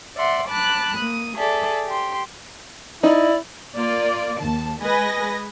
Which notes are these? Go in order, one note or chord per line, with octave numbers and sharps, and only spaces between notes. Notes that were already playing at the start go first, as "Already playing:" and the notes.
D5 E5 F#5 C6
A5 B5 D6 F#6
A#3 D#6
G#4 A4 D5 E5
G4 C6
D#4 E4 D5
A#3 F4 D5
D#2 A5
G#3 B4 D#5 G#5 B5 A#6